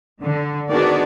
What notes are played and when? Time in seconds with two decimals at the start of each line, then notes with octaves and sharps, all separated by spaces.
0.22 D3
0.70 D#3 B3 D4 F#4 G#4 D5